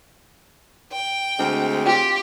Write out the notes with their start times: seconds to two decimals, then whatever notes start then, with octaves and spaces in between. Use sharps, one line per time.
0.92 G5
1.39 D2 G#3 C4
1.86 F4 G4 G5